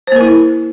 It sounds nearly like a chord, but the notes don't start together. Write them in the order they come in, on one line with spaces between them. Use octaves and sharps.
C5 A#3 A#4 E4